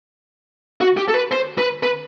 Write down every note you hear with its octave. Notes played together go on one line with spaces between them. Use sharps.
F#4
G4
A4
B4
C5
B4
B4